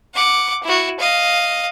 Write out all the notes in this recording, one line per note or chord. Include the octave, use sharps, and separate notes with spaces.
F#5 D6
E4 F#4
D#5 F5